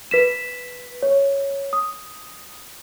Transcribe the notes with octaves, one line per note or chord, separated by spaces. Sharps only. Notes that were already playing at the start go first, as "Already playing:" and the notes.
B4 B6 E7
C#5
D#6